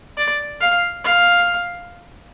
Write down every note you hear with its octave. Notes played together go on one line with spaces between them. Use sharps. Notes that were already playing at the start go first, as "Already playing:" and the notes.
D5
F5
F5